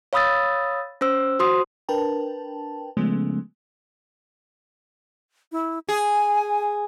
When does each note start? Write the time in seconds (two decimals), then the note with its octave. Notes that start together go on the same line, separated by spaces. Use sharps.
0.13 C#5 F5 B5 D#6 E6 A6
1.01 C#4 C5 E6
1.39 F#4 C5 C6 D#6
1.89 D4 A#4 B4 G5 A5
2.97 C#3 F3 G#3 A3 B3 C#4
5.52 E4
5.89 G#4 G#5